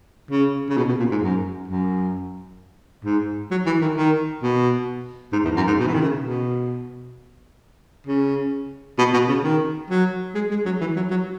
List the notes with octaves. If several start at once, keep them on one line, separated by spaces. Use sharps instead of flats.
C#3
C#3
B2
B2
A#2
G#2
F#2
F#2
G#2
F#3
E3
D#3
D#3
B2
G#2
E2
F#2
G#2
B2
E3
D#3
C#3
B2
C#3
B2
B2
C#3
D#3
F#3
G#3
G#3
F#3
E3
F#3
F#3